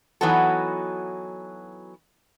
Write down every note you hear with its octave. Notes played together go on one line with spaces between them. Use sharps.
E3 F#3 B3 D#4 F#4 A4